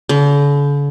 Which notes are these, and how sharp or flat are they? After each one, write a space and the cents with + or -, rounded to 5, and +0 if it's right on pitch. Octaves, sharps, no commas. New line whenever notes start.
D3 -45